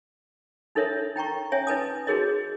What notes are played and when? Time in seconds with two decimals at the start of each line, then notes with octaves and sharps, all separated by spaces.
0.75 D4 D#4 A4 A#4 C#5 E5
1.16 D#4 G5 A#5 C#6
1.52 C#4 C#5 E5 G#5
1.67 D#4 B4 A5 D#6
2.07 D#4 F#4 G#4 A#4 C#5 D#5